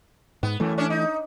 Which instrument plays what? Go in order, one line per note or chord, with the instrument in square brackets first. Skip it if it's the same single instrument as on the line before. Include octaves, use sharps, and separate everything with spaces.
[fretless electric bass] G#2 [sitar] B3
[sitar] F#2 [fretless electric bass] E3 A3
[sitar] C#4 D4 D5
D#4